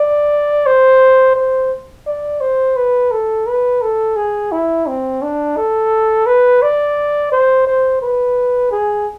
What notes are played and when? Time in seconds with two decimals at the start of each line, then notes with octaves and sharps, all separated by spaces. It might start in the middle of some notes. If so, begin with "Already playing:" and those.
Already playing: D5
0.66 C5
1.36 C5
2.07 D5
2.41 C5
2.76 B4
3.12 A4
3.47 B4
3.82 A4
4.16 G#4
4.52 E4
4.87 C4
5.22 D4
5.57 A4
6.26 B4
6.62 D5
7.32 C5
7.67 C5
8.02 B4
8.71 G#4